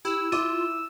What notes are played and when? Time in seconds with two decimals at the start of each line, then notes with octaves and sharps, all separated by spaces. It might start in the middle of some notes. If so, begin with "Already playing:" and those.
0.05 E4 G4 E6
0.32 E4 F4 D6 D#7